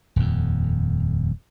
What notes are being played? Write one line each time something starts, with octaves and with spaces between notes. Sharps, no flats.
D#1 F2